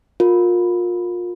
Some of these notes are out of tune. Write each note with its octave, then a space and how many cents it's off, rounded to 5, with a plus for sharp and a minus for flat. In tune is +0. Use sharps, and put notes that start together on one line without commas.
F4 +30 A#4 +0